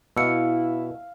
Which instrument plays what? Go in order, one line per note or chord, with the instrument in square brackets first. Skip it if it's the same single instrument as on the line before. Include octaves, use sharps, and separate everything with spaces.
[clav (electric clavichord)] B2 [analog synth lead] E4 [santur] F5 [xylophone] E6 C#7